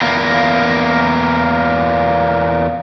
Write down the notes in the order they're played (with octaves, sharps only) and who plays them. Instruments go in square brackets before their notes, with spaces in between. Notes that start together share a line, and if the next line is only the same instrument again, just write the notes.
[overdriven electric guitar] E2 A#3